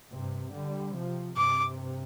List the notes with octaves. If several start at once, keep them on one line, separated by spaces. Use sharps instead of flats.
G2 C3
D3 G3
C3 F3
G2 C3 D6